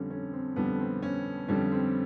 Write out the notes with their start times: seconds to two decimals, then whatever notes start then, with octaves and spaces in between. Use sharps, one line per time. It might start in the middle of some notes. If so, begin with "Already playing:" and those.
Already playing: F2 D3 G3 C#4
0.10 C#4
0.33 C4
0.56 F2 D3 G3 B3
0.80 C4
1.02 C#4
1.48 F2 D3 G3 C#4
1.72 C4